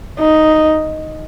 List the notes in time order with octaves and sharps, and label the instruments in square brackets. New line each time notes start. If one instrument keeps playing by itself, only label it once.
[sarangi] D#4